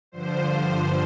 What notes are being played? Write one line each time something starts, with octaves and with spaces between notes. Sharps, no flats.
G2 D3 F3 C5